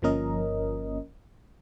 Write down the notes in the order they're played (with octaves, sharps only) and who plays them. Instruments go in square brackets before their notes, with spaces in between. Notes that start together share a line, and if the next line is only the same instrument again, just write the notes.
[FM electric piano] G1 F3 A#3 C#4 A#4 D#5